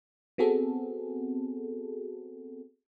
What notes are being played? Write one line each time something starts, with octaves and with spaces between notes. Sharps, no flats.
B3 C4 F#4 G#4 A4